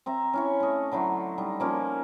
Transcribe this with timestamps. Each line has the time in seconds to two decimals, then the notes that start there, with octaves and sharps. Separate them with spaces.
0.06 C4 E5 A#5
0.34 C#4 E4 C#5
0.60 A3 D#5
0.92 D3 F#3 E4 C5
1.38 G3 D#4
1.60 F3 A#3 C#4